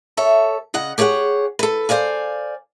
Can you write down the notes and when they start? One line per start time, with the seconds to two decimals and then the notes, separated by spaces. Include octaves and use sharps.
0.17 A4 C#5 E5
0.74 C#3 D#5 F#5
0.98 G4 G#4 C#5 E5 F#5
1.59 A4 B4
1.89 C5 D5 F5 G#5